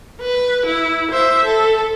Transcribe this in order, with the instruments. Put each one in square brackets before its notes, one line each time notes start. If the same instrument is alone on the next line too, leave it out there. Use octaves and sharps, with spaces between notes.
[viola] B4
E4
C5 E5
A4